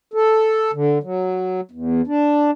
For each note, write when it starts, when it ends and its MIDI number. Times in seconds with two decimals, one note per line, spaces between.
0.14 0.71 69
0.73 0.98 50
1.03 1.61 54
1.71 2.02 40
2.07 2.51 62